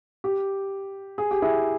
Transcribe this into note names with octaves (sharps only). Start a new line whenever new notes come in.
G4
G#4
G4
E4 G#4